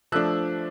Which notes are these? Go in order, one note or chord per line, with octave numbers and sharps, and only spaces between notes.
F3 A3 D4 E6 F#6